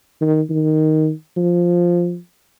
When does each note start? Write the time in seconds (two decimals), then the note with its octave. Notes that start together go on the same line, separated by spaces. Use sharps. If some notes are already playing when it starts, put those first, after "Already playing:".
0.21 D#3
0.50 D#3
1.37 F3